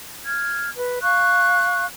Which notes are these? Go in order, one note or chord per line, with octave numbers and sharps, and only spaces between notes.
F6 G#6
B4
F5 C#6 F#6